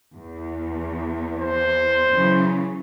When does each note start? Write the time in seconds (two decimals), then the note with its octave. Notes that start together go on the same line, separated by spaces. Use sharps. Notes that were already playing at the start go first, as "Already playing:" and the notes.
0.15 E2
1.39 C5
2.12 C#3 E3 F#3